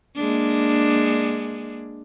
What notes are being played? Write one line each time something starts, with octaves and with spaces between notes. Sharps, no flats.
G#3 A#3 D4